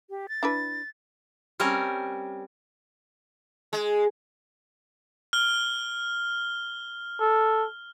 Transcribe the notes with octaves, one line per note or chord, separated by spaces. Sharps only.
G4
A6
D4 E4 B4
G3 C4 C#4 A#4
G#3
F6 G7
A4